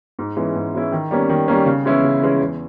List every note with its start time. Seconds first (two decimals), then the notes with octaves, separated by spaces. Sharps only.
0.19 G#2
0.37 E3 G#3 C#4 E4
0.55 G#2
0.74 E3 G#3 C#4 E4
0.92 D#3
1.11 G3 A#3 C#4
1.29 D#3
1.48 G3 A#3 C#4
1.66 C#3
1.85 E3 G#3 C#4 E4
2.03 C#3
2.22 E3 G#3 C#4 E4
2.41 E2